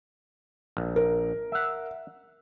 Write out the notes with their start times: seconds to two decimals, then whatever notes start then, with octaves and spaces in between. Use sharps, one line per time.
0.77 A#1
0.96 A#4
1.52 E5 F#5